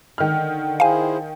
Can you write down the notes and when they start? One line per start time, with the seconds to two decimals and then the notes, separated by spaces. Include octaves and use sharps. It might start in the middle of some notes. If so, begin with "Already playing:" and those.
0.18 D3 D#3 F6
0.80 E4 G#4 C5 F5 G#5